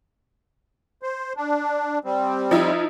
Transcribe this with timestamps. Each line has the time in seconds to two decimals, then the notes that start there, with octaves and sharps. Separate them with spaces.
1.03 C5
1.37 D4
2.04 G3 C4
2.51 F3 D#4 E4